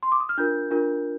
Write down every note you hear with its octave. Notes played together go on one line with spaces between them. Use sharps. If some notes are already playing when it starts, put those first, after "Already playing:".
C6
D6
D#6
F6
D4 F4 A#4 G6
D4 F4 A#4